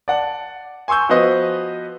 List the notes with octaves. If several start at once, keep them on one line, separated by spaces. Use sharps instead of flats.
D5 F#5 A5
G#5 C6 C#6 E6 G6
F3 B3 F#4 B4 C5 D#5